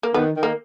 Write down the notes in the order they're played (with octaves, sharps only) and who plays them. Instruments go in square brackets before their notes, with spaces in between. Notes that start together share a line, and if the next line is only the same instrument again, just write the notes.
[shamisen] A#3
[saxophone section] D#3 [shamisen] B3
[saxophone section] D#3
[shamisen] A#3